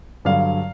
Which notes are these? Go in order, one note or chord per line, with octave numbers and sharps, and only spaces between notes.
G2 D3 F#3 F5